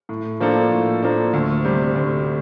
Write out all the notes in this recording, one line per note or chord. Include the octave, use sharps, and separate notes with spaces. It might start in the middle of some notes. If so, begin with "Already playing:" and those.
A2
F3 A#3 D4 A4
A2
F3 A#3 D4 A4
D2
C3 G3
D2